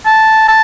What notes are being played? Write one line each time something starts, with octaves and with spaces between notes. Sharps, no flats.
A5
A5